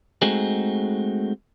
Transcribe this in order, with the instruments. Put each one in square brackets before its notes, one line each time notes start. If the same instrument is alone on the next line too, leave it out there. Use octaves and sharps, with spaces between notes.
[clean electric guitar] G#3 A3 C4 D#4 F#4 G#4